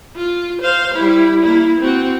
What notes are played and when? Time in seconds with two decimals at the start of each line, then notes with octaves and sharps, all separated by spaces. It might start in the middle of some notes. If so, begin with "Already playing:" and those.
0.15 F4
0.62 C5 F5
0.94 G3 E4
1.43 A#3 E4
1.80 C4 F#4